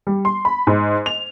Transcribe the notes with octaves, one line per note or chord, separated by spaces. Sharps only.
G3
C6
B5
G#2
F7